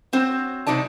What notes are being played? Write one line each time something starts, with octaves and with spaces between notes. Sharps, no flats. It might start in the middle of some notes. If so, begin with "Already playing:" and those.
F#3 C4 C5
C3 F#3 D#4 D5 A5